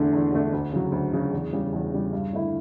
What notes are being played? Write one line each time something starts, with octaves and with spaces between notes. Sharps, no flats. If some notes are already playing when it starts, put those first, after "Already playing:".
Already playing: E2 D3 A3 D4
E2
D3 A3 D4
D2
C#3 F#3
D2
C#3 F#3
E2
C#3 G3
E2
C#3 G3
G2
D3 A3 E4